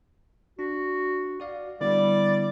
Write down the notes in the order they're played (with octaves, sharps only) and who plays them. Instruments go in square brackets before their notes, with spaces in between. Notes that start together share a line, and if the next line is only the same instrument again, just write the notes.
[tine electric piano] D4 [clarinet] F#4
[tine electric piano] F#4 D5 F5
[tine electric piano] D3 B3 E4 [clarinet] G3 [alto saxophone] D5